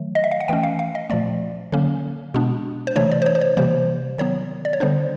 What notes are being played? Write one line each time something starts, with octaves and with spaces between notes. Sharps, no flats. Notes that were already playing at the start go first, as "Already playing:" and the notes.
Already playing: D#3 F#3 A3
D#5
E5
F5
F#5
E3 A3 C#4 G5
F5
F5
D#5
A#2 F3 A3 D5
D3 F#3 A#3 C#4
B2 G#3 B3 D4
C5
C3 E3 A3 D4 C#5
D5
C5
C#5
C5
C#5
C3 E3 G3 A#3 C5
D#3 F#3 B3 C#5
D5
C#5
D3 G3 B3 D4 C5